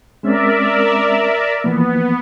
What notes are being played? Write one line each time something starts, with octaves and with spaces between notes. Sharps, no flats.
G#3 C4 C#4 A#4 D5 E5
E3 F3 A#3 B3